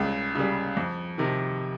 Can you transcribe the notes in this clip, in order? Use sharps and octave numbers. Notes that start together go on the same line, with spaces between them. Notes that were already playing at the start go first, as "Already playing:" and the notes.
Already playing: C#2 C#3 G3
C#3 G3
F2
C3 D#3